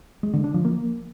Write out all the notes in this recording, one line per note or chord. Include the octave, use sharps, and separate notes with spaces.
G#3
D3
D4
F3
A#3